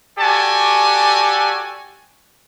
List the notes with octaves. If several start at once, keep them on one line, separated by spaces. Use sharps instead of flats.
F#4 G4 A4 D5 G#5